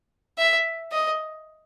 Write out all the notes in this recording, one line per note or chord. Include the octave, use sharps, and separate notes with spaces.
E5
D#5